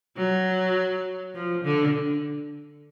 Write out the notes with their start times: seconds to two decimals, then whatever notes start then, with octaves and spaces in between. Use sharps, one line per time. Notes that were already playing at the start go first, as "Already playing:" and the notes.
0.17 F#3
1.34 F3
1.64 D3